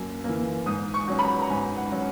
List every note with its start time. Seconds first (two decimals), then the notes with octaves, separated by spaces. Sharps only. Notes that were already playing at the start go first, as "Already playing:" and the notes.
Already playing: F#2 A#3
0.24 E3 A#3
0.66 G#2 D#6
0.94 C#6
1.08 F#3 C#4
1.19 B5
1.23 A#5
1.42 A#5
1.50 G#2 G#5
1.77 F#5
1.91 F#3 C#4